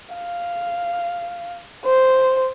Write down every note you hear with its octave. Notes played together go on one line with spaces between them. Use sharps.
F5
C5